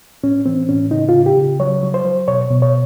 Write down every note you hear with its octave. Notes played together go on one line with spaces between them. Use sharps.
A2 C#4
E3 C4
A2 C#4
C#3 D#4
F4
C#3
G4
C#3
F#3 C#5
F#3
C5
F#3
B2 C#5
B2
C#5